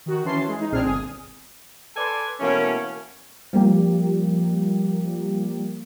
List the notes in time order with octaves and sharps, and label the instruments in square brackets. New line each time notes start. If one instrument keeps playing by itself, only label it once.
[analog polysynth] D#3 F#4
E3 C#4 A5 C6 C7
E3 G#3
D#4
A#1 C4 D4 G#4 F6 C7
G1 G#5 D#6
[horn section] A4 B4 D5 G#5 A5 C6
B2 E3 A3 A#3 C#4
[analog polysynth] F3 G3 A#3 G4